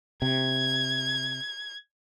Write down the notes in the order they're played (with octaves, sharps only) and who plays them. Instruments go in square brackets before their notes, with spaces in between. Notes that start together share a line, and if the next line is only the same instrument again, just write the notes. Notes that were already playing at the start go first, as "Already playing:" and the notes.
[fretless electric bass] C3 [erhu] G#6